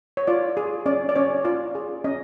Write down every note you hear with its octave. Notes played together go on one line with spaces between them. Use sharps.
C#5
F4 D5
G#4
C#4 D5
D5
C#4 C#5
F4 D5
G#4
C#4 D#5